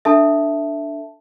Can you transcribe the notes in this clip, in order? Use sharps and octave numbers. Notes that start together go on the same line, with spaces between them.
D4 A4 E5 A5